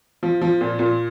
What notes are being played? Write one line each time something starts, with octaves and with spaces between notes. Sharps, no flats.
F3
F3
A#2
A#2